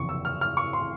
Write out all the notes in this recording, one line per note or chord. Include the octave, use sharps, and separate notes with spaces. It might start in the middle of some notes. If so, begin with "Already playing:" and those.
Already playing: F#1 E2 C3 F3 C#6
E6
F6
F6
C#6
C6